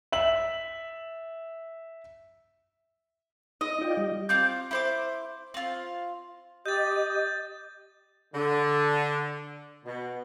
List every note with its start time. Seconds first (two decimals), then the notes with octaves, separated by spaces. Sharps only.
0.12 E5 F#7
3.61 D#4 D#5
3.81 F4 D5 G5
3.97 G3
4.29 C4 F4 D6 G6
4.71 E4 C5 D6
5.54 C4 F4
6.66 G4 D#5 G6 A6
8.33 D3
9.85 B2